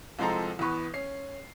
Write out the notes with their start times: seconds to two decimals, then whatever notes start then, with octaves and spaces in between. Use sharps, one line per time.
0.19 C2 F3 G#3 C4 A4 A#5
0.59 E2 E3 B3 B4 C#6
0.94 C#4 C7